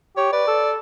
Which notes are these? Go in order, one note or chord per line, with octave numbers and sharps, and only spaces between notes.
G4 C#5
B4 D5
A4